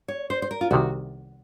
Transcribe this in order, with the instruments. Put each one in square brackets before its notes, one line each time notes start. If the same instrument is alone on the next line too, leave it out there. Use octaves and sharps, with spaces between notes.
[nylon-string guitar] C#5
C5
C5
A#4
F4
[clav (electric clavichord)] C2 C3 D#3 [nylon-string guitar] F#4